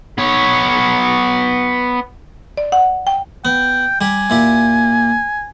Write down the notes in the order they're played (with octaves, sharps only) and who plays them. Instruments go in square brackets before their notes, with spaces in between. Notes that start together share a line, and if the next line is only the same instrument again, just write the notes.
[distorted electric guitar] B3 C#5
[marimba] D5
F#5
G5
[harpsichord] B3 [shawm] G5
[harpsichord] G3 G4 [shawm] G#5
[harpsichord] A#2 E4 G4